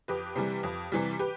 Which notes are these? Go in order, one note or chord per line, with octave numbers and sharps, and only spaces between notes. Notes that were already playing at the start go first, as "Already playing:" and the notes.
F2 G4 B4
C3 E3 G3
F2
C3 E3 G3
G4 B4